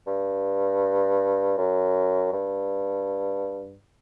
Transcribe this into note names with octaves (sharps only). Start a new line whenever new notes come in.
G2
F#2
G2